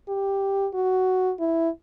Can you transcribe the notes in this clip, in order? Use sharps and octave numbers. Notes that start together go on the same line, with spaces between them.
G4
F#4
E4